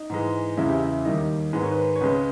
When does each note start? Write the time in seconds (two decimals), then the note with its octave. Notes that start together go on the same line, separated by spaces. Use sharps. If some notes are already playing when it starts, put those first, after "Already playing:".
Already playing: D#4
0.10 G#2 E3 G#3
0.57 E2 C#3 G#3 E4
0.69 G4
0.80 E4
1.05 D#2 D#3 G3 D#5
1.53 G#2 D#3 G#3 B4
1.63 C#5
1.71 B4
1.96 C#5
2.01 C#2 C#3 G#3 B4
2.15 B4